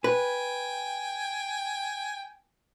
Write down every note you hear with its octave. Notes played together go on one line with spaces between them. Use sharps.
B4 G5 G#5